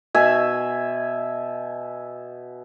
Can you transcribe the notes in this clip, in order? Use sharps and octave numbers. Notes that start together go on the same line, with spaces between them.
B2 E5 G#5